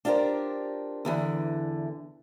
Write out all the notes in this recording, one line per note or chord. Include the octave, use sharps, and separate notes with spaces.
D4 F4 G4 A#4 C5
E2 D3 E3